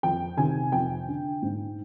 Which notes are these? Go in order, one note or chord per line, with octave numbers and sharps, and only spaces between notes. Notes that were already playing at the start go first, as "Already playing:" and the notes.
F2 G5
C3 D#3 G#5
F2 G5
D3
G#2